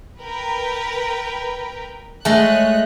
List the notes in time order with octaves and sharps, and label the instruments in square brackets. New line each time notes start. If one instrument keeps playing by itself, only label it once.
[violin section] A#4 B4 G5
[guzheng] G#3 A3 [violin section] C#5 D#5 F#6